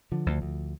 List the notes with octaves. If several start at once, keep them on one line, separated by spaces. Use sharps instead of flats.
D3 F3
D2
D2